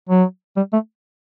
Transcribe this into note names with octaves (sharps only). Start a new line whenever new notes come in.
F#3
G3
A3